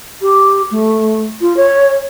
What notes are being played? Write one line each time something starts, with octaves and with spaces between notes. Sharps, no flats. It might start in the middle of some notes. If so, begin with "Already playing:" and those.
G4
A3
F4
C#5